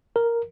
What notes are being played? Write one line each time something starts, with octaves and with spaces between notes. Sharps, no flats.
A#4